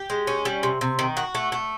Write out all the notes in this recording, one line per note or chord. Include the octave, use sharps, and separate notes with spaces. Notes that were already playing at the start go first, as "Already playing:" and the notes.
Already playing: G4
G#3
C#4
G3
C3
C3
D#3
F#4
A3
A3